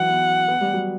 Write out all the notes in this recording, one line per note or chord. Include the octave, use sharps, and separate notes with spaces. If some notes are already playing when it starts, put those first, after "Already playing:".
Already playing: E3 F#3 F#5
B3
B3
G3
F#3